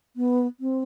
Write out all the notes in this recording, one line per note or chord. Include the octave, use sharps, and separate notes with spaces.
B3
C4